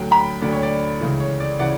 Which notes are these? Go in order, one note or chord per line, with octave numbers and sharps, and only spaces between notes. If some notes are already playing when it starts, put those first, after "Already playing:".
Already playing: D2 D3 F#3 G5
G5 B5
D2 D3 F#3 D5
C#5
D5
C#2 C#3 E3
C#5
D5
C#3 E3 D5 F#5